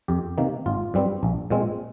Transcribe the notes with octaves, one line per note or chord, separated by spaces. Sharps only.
F2 G4
C3 D#3 A#3
G#1 F4
G2 G3 C4
A#1
A#2 G#3 C4